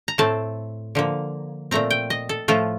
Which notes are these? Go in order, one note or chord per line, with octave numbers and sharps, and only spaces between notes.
A#5
A2 A3 C4 A5
D3 F3 A#3
A#2 A3 C4 A#5
G5
D#5
A4
A2 F3 A3 F4